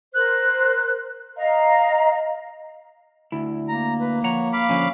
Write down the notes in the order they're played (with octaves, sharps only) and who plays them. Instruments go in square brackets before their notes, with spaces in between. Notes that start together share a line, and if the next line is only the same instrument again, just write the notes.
[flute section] A#4 C5 F#6
D#5 F5 A#5
[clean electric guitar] D2 E4
[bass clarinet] A#3 [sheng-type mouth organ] A#5
[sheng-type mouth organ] B4
[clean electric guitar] F3 F#5 A#5 [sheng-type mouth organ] C#5
[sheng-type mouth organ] F5 B5 D6
[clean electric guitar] D3 F3 C#4